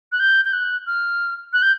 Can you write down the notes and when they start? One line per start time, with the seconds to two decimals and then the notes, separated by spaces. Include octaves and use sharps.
0.12 F#6
0.20 G6
0.45 G6
0.53 F#6
0.87 F6
1.53 F#6
1.62 G6